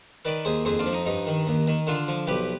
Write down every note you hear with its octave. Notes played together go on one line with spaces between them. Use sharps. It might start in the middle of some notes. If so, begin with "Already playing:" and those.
D#3 B4 D5
D#2 G#4 C5
F2 G#4 C5
D4 F4
F3
D#4
G2 D#4
D#3
D#2
D#3
D3 D4 F4
F3
B1 G4 B4